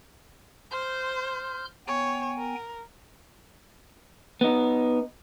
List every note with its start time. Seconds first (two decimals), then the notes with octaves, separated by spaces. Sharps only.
0.71 C5 C6 F6 G6
1.88 B3 C#5 G5 G#5
2.38 A#4
4.41 B3 D#4